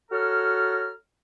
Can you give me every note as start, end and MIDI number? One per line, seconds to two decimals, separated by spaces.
0.10 0.91 66
0.10 0.91 69
0.10 0.91 73
0.10 0.91 82
0.10 0.91 89